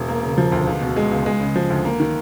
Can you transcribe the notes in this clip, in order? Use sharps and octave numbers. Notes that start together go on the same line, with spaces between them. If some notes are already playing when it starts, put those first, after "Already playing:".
Already playing: E1
A#3
C#3
F3
D2
C#2
B2
G#3
C#2
G#3
C#3
F3
D2
A#3
D#3